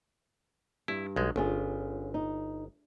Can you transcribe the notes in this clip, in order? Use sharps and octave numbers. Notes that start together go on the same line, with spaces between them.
G2 E4
B1 G#3
G1 C#4 F4 G#4
D#4